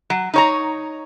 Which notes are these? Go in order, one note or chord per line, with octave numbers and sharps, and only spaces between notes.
F#3
D#4 C#5 A#5